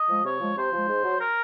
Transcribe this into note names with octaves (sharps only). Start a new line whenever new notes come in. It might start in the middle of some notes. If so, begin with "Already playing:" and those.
Already playing: D#5
F3 G#3
C3 C#5
F3 G#3
C3 C5
F3 G#3
G#2
F#3
A#4